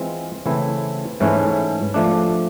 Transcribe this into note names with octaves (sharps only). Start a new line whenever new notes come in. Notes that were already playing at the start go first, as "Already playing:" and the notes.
Already playing: E3 G#3 C4 F4
C#3 E3 A3 C4 E4
G#2 E3 A3 C#4 E4
F3 A3 D4